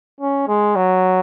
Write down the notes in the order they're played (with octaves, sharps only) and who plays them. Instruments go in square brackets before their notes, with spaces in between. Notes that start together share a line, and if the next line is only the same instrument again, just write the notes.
[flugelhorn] C#4
G#3
F#3